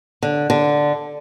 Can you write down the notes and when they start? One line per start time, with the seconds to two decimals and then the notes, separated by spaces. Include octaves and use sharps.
0.22 D3
0.50 D3